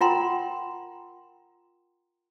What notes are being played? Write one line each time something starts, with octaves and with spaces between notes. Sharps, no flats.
F4 A#4 F#5 G5 A#5 C6